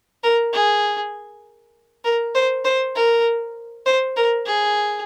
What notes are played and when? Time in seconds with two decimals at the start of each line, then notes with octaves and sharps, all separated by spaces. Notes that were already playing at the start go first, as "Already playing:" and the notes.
0.23 A#4
0.53 G#4
2.04 A#4
2.35 C5
2.65 C5
2.96 A#4
3.86 C5
4.17 A#4
4.46 G#4